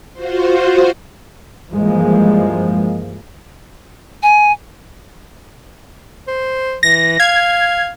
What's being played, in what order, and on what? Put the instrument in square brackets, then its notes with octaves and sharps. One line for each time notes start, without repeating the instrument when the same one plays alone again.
[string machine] F4 F#4 C5
[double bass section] G2 E3 F3 G#3 A#3
[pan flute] G#5
[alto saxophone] C5
[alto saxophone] E3 [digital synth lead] A#6
[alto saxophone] F5 [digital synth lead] G#6